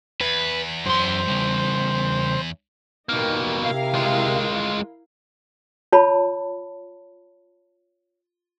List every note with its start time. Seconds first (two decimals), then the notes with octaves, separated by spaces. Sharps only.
0.21 E2 B4
0.86 F#2 C5 C6
1.28 C#3 G3
3.09 B2 A#3 D#4 G4 A#4
3.63 C3 E4 A#4 F5
3.95 G#3 F4
5.92 F4 C#5 A5 B5